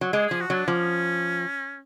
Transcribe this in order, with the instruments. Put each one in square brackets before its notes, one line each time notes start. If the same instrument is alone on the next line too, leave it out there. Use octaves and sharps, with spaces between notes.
[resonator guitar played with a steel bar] F#3
[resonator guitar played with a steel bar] G#3 [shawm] G#4
[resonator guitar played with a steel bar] F3 [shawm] G#4
[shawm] F#4
[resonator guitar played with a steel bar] F#3 [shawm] D4
[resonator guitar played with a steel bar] F3 [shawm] C#4